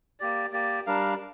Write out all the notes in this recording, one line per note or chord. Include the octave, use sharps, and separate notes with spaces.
A#3 G4 D5
A#3 G4 D5
G3 D4 A#4 F5